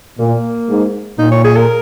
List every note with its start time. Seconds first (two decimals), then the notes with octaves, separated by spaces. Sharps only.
0.19 A#2 A#3
0.69 G#2
1.19 A#2 D#4
1.32 C#5
1.44 G#4
1.56 A#4